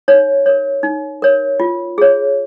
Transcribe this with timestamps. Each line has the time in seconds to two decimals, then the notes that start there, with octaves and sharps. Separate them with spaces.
0.08 D#4 C#5
0.46 A#4 C#5
0.83 D#4
1.22 A#4 C#5
1.60 F4
1.98 G#4 C#5